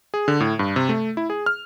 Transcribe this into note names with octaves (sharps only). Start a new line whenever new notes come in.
G#4
D3
A2
G2
C3
A3
E4
G#4
F6